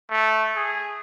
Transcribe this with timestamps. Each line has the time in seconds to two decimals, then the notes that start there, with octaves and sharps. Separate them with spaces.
0.10 A3
0.56 G#4